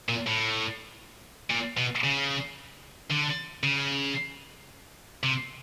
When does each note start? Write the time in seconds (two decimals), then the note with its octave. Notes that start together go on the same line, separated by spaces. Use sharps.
0.09 A#2
0.27 A2
1.50 A#2
1.77 B2
2.04 C#3
3.10 D3
3.63 C#3
5.23 C3